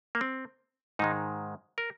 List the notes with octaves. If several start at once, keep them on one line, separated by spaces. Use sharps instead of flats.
A#3
C4
G#2 D#3 G#3 D#4
A#4